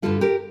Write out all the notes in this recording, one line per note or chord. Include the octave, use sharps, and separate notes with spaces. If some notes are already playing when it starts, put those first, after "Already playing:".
G2 D3 G3 F4 A4
G4 A#4